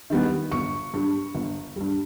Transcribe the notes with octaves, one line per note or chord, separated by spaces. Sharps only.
D#3 G3 B3
G1 C#6
G2 G3
G1
G2 G3